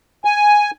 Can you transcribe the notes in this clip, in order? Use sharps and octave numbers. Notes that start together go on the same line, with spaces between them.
G#5